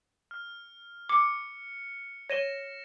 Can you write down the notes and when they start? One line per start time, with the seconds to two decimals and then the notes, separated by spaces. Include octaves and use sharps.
0.31 F6
1.09 D6 C#7
2.30 C#5 A#6 D#7 E7 G7